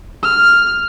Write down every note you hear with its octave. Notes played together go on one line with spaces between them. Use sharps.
F6